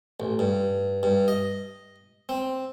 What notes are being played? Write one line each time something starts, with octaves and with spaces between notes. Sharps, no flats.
A1
G2
G2
D#5
C4